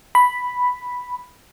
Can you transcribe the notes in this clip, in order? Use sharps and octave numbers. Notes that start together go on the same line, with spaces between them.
B5